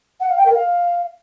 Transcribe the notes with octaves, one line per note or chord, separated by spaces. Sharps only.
F#5
F5
G5
A#4
F5